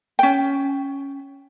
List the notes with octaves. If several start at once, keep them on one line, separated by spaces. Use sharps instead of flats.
C#4 G5